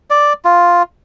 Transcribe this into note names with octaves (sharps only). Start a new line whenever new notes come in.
D5
F4